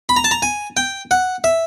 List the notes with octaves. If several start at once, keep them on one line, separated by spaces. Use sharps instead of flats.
B5
A#5
A5
A#5
G#5
G5
F#5
E5